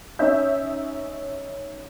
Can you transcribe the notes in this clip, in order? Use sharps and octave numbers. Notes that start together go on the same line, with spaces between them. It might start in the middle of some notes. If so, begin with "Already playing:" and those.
C#4 D#4 E5 G6